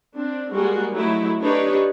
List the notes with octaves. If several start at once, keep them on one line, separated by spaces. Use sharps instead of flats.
C4 D4
G3 G#3 A#3 F#4 G#4
F#3 A3 D#4 E4
D4 D#4 G4 A4 B4 C#5